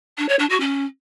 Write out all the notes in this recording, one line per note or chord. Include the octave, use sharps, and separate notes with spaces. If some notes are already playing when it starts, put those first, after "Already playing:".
D4
C#5
D4
F#4
C#4